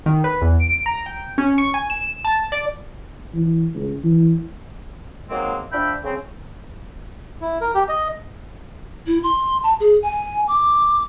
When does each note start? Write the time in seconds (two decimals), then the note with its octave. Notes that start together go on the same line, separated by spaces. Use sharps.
0.06 D#3
0.24 B4
0.41 E2
0.59 D7
0.86 A#5
1.06 G5
1.38 C#4
1.58 C#6
1.74 G#5
1.90 E7
2.24 A5
2.52 D5
3.35 E3
3.75 C#2
4.04 E3
5.30 D#3 F#3 G#3 A#3 C4
5.72 F3 D4 E5 G5 B5
6.04 C#3 C4
7.41 E4
7.61 A#4
7.75 G4
7.89 D#5
9.07 E4
9.24 C6
9.63 A5
9.80 G#4
10.03 G#5
10.48 D6